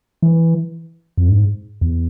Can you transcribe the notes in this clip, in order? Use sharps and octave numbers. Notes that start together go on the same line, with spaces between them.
E3
F2
G#2
E2